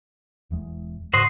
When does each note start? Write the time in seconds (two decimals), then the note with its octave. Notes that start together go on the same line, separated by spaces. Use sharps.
0.50 E1 E2 G#3
1.13 G#2 C#3 F#4 C5 D#5